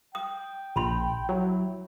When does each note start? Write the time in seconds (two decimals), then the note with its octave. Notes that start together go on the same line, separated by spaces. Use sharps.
0.15 G5 D#6
0.76 A#1 A5 B5 C6
1.29 F#3 E4